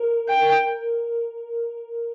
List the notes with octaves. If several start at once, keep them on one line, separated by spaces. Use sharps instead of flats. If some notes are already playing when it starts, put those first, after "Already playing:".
Already playing: A#4
G5